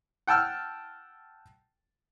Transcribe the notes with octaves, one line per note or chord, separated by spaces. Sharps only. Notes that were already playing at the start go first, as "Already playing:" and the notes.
F#5 G5 A5 E6 F6